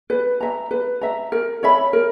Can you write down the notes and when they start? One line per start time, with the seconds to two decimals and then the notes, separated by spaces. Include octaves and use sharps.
0.10 B4
0.41 E5 A#5
0.71 B4
1.01 E5 A#5
1.32 A#4
1.63 C#5 E5 B5
1.93 A#4